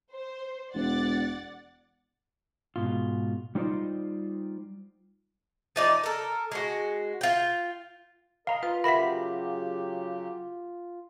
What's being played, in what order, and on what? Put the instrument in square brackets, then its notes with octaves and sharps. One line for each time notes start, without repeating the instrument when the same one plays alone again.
[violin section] C5
[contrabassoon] E1 [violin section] D5 F#5 A6
[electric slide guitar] G#2 B2 F4
G3 D#4 F4 C5 D5
[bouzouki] F3 D#4 D5
A4 A#4
G#3 F#4
F4 G5
[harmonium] A#4 D#5 [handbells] F5 A#5
[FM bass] F4 [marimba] B4
[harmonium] C#3 F#3 G4 [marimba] A#4 E5 F#5 [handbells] B5 B6